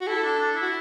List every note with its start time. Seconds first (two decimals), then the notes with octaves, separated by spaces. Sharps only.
0.01 F#4
0.07 E4 A4
0.24 D4
0.39 D4
0.55 E4
0.62 F#4